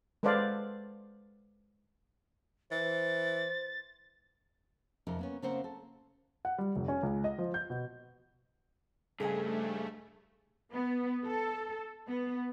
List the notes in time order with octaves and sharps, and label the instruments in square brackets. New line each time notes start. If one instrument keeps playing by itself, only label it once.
[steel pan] G#3 A4 B4 C5 D5 F5
[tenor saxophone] E3 [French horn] C5 [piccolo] A6
[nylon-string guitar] F2 C3 D#4 A#4
A#3 B3 C#4
C#3 A#3 C4 A#4 C5 F#5
A4
[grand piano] F#5
G3
F1
C#4
C#2
D#5
F3
G6
B2
[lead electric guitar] G2 [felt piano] C#3 G#5 [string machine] A3 [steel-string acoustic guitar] A4 C5 D#5
[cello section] B3
A4
B3